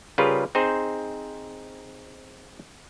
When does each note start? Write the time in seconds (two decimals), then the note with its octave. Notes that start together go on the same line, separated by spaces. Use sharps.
0.18 C#3 G3 F4 G#4 A#4 B4
0.55 C4 D#4 G#4 C5